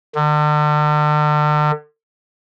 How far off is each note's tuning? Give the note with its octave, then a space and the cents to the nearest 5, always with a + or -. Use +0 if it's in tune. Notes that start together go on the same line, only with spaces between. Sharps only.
D3 +40